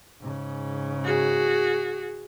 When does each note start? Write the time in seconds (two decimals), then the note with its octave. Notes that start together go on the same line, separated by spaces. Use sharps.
0.21 G#2 C#3
1.04 F#4 G#4